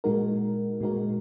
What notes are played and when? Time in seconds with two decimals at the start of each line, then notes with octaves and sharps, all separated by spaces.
0.04 A#2 G#3 D#4 F#4 A#4
0.81 A#2 G#3 D#4 F#4 A#4